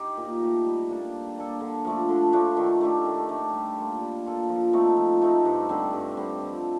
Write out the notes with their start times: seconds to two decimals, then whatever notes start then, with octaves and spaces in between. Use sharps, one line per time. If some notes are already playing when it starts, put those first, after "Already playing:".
Already playing: D#4 G4
0.17 A#2
0.41 A3 D#4 G4
0.65 G3
0.89 A#3 D4 A4
1.13 G3
1.37 A#3 D4 A4
1.61 D3
1.85 F3 A3 D4
2.09 D3
2.32 F3 A3 D4
2.57 D#3
2.81 A3 D4 G4
3.05 D#3
3.29 A3 D4 G4
3.53 G3
3.77 A#3 F4 A4
4.01 G3
4.25 A#3 F4 A4
4.49 F3
4.73 A3 C4 D#4
4.97 F3
5.21 A3 C4 D#4
5.45 G2
5.69 D3 G3 C4
5.93 G2
6.17 D3 G3 C4
6.41 F3